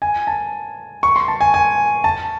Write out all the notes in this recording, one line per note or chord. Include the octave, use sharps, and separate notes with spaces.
G#5
A5
C#6
C6
A5
G#5
G#5
A5